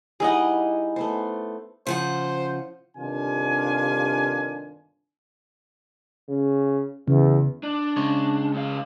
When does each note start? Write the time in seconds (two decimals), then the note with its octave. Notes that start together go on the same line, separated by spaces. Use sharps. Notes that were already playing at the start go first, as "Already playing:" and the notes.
0.20 G3 D#4 E4 G#4 D#5 F#5
0.96 A3 B3 C5
1.87 C#3 F3 C5 F#5
2.97 G1 C3 D#3 D4 F4 G#5
6.28 C#3
7.08 E2 C#3
7.63 D4
7.96 C#3 G#3 C#5
8.53 G#2 F5